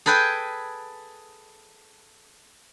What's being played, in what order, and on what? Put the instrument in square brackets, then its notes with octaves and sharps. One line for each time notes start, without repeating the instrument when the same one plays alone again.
[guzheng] G#4 A4 B4 G5 G#5